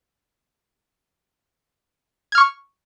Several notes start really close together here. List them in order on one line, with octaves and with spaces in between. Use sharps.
G#6 F6 C#6